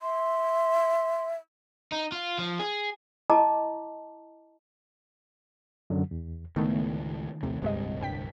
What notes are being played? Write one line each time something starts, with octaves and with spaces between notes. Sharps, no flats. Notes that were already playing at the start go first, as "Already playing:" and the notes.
E5 C6
D#4
F4
F3
G#4
E4 D#5 A5 A#5 C#6 D6
F#2 D3 F#3
E2
C#2 A2 D#3 A3 B3
A#1 D#2 C3 A3
D1 C2 G2 C3 G#3 D#5
G2 G5 B6